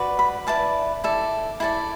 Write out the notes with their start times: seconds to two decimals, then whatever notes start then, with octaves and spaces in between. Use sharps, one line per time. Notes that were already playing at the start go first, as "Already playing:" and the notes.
Already playing: F#4 B4 D5
0.19 B5
0.47 E4 B4 D5 A5
1.04 E4 A4 D5
1.60 E4 A4 D5 B5